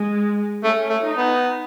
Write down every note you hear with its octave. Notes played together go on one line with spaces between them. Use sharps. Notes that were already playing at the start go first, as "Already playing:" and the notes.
Already playing: G#3
A3 C#4
A3
D#4
B3